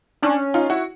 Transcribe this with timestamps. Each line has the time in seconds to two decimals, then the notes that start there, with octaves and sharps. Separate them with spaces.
0.22 C#4 D4
0.54 D#4 F4
0.70 E4 F#4